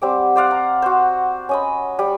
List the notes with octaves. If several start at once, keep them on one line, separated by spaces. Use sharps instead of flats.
G3 C4 F#5 D6
C5 D5 F5 F#5
A#5
F#4 C5
C#4 D#5 B5
G3